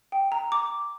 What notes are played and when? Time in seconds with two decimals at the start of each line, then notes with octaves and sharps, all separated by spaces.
0.12 G5
0.32 A#5
0.52 D6